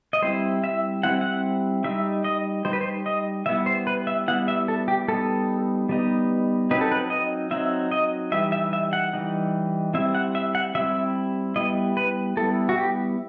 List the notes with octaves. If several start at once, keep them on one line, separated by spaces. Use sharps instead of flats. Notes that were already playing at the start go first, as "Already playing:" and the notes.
D#5
G3 C4 E4 C5
E5
G3 C4 E4 F#5
F#5
G3 D#4 E5
D#5
G3 D#4 C5
B4
C5
D#5
G3 B3 E4 E5
C5
B4
E5
G3 B3 E4 F#5
E5
A4
G4
G3 B3 D#4 A4
G3 B3 D#4
F#3 C4 D#4 B4
A4
B4
D#5
F#3 C4 D#4 E5
D#5
E3 G3 D#4 E5
E5
E5
F#5
E3 G3 D#4
G3 C4 E4 E5
F#5
E5
F#5
G3 C4 E4 E5
G3 B3 E4 D#5
B4
G3 B3 E4 A4
F#4
G4